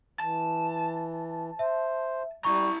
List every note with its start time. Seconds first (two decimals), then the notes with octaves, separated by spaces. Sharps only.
0.20 E3 A5
1.59 C5 E5
2.44 G3 E4 A#5 C#6